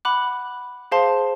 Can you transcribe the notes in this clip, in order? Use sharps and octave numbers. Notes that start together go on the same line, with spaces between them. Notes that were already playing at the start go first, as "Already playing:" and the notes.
F#5 B5 D6 F#6
G#4 C5 F5 A5 C6